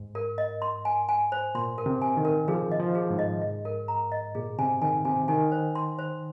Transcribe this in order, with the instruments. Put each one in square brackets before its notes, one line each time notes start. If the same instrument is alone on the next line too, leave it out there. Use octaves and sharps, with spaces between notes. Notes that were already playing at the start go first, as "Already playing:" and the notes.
Already playing: [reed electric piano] G#2
[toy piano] A#4
D#5
C6
G#5
G#5
C5
[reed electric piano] A#2 [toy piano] C6
[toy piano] A#4
[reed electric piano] C3
[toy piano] G#5
[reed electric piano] D#3
[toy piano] A#4
[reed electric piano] F3 [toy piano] G#4
[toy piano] D#5
[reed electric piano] F3
[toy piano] G#4
[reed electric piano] G#2
[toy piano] D#5
D#5
A#4
A#5
D#5
[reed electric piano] A#2 [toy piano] G#4
[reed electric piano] C3 [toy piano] G#5
[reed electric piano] D#3 [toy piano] G#5
[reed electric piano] C3 [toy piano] G#5
[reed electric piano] D#3 [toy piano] G#5
[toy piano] C5
C6
C5